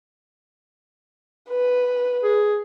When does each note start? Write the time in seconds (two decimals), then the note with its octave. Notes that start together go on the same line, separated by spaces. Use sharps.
1.50 B4
2.23 G#4